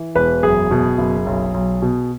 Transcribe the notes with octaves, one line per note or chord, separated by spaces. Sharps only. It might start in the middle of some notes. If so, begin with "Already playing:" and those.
Already playing: E3
E1 B4
F#1 G#4
B2
F#1
B1
B1
B2